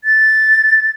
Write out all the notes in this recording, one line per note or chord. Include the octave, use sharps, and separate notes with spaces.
A6